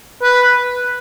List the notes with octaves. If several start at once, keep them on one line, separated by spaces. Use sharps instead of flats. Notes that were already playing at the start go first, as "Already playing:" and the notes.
B4